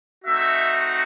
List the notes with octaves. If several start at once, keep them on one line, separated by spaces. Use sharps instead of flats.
A3 C4 D#4 F#4 E5